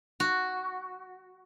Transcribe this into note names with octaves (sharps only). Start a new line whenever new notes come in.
F#4